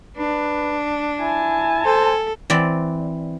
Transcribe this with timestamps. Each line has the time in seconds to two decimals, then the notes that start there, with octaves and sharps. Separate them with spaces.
0.18 D4 B4
1.21 E4 G#5 A5
1.85 A4 C5
2.50 E3 C4 D5